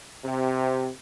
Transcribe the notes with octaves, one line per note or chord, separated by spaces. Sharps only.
C3